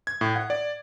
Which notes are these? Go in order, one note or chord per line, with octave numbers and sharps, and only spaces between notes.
G#6
A2
F#5
D5